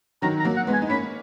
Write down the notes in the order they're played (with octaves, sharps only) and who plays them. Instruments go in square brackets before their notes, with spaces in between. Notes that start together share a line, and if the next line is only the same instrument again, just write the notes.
[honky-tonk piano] D#3 F#3 [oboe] A#5
[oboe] A#5
[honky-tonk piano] F#3 A#3
[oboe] F#5
[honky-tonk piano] G#3 B3
[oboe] G#5
[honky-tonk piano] D#4
[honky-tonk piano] A#3 C#4 [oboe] B5